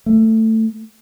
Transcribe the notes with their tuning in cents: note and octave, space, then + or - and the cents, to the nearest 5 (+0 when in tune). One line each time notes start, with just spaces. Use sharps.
A3 +15